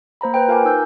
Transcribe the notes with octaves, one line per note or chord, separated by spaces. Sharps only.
A#3 C5 A#5 B5
B4 C5 G5
F4 A#4 F5 G#5 D6
D#4 E6 G6